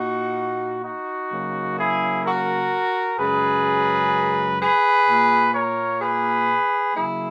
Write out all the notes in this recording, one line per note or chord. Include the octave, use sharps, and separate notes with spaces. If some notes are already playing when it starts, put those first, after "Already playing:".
Already playing: A#2 A#3 D#4 F#4
D#4 F#4
C#3 F#3 A#3
E4 G#4
F#4 A#4
F#2 C#3 G#3 G#4 B4
G#4 B4
A#2 A#3
A#4 C#5
G#4 B4
C#3 F#3 A#3 E4 G#4